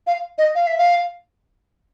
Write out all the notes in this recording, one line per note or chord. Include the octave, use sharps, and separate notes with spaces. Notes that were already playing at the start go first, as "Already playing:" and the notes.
F5
D#5
F5
E5
F5